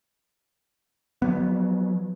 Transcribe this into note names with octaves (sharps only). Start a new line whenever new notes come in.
F3 F#3 B3